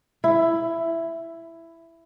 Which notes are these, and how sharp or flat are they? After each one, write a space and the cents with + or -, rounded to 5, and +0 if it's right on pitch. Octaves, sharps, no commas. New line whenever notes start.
E4 +10